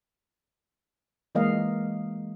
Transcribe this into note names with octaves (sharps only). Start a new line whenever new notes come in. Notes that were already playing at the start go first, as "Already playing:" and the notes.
E3 G#3 A#3 D#5 F5